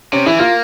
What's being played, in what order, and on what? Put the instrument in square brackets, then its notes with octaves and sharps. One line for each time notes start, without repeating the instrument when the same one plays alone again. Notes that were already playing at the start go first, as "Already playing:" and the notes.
[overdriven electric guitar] C3 [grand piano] C#4
[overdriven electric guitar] E3 [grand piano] E4
[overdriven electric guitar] A#3 [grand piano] F4